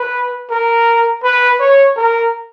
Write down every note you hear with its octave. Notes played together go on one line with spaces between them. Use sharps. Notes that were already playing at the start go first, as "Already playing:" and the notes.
Already playing: B4
A#4
B4
C#5
A#4